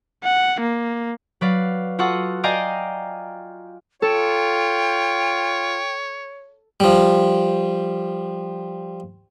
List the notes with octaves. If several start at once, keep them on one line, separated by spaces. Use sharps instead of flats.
F#5
A#3
F#3 B4 D5 F5
F4 F#4 A4 F#5 D#6
D5 D#5 F5 G5 G#5 A#5
F4 A4 C#5 G5
F3 G3